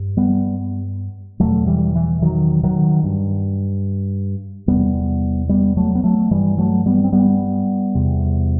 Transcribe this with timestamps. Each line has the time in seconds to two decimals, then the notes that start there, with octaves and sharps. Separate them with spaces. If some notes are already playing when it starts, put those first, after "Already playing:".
Already playing: G2
0.17 G3 B3
1.40 E2 B2 F#3 A3
1.67 E3 G3
1.95 E3
2.22 D#3 F#3
2.63 D#3 F#3
3.03 G2
4.67 E2 C3 G3 B3
5.49 G3 B3
5.77 F#3 A3
5.95 B3
6.04 F#3 A3
6.31 G2 E3 G3
6.58 F#3 A3
6.86 G3 B3
7.04 C4
7.13 G3 B3
7.95 E2 C3